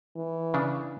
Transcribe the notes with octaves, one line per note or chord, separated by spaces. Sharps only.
E3
C#3 D4